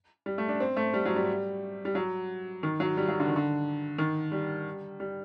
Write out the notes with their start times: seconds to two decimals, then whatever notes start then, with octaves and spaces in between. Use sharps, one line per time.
0.26 G3
0.38 A3
0.48 D4
0.60 C4
0.77 A3
0.94 G3
1.05 F#3
1.16 G3
1.85 G3
1.95 F#3
2.63 D#3
2.80 F#3
2.97 G3
3.08 F#3
3.20 D3
3.28 D#3
3.36 D3
3.98 D#3
4.32 G3
5.00 G3